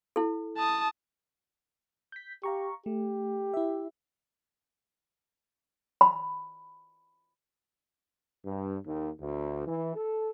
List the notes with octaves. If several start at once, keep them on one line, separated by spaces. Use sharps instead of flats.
E4 A4
A5 D#6
G6 B6
G4 F5 A#5 C#6
A3 G4
E4 E5
B5
G2
D#2
D2
E3
A4